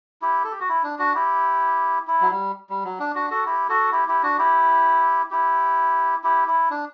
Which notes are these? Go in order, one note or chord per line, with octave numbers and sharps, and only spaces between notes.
E4 G4
A4
G4
F#4
E4
D4
D4 F#4
E4 G4
E4
F#3
G3
G3
F#3
D4
D4 F#4
F#4 A4
E4 G4
F#4 A4
E4 G4
E4 G4
D4 F#4
E4 G4
E4 G4
E4 G4
E4
D4